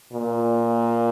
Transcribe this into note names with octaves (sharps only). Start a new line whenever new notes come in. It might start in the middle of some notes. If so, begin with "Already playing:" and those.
A#2